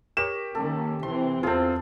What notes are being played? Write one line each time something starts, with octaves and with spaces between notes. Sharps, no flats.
G4 A#4 C#5 E7
D#3 A#3 C#4 A4
C3 E3 C4 C6
E2 C4 F4 G#4 A4